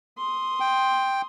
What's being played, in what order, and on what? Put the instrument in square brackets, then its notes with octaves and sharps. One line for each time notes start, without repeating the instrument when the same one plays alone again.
[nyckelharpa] C6 D#6
[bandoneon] G5